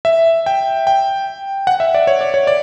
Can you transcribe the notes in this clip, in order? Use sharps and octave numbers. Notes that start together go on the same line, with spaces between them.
E5
G5
G5
F#5
E5
D5
C#5
D5
C#5
D5